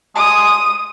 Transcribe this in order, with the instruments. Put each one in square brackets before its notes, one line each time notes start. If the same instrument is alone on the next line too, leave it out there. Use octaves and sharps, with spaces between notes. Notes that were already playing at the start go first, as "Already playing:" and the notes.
[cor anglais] G#3 [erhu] D#6